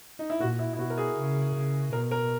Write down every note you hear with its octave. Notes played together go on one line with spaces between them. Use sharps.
D#4
E4
A#2 F#4
E4
E4
B2 F#4
A#4
G#4
C#3
C#3
B2 A#4
A#4